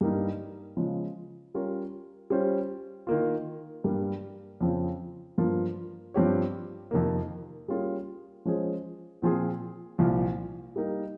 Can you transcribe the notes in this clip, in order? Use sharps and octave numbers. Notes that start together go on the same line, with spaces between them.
G2 G3 A#3 D#4
C#3 F3 G#3
G3 C#4 F4 A#4 C#5
G3 C#4 F4 C5
D#3 A#3 F4
G2 G3 A#3
F2 C#3 F3 C4
G2 F3 A#3 F4
G2 F3 C4 G4 C#5
F2 C3 D#3 A#3
G3 A#3 C#4 F4 G#4
F3 G#3 C#4 G#4 C5
A#2 F3 C4 F4 G#4
C2 A#2 F3
G3 A#3 D#4 A#4